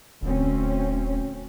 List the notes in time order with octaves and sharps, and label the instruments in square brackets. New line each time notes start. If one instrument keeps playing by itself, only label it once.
[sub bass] D#1 [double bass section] D2 C4 C#4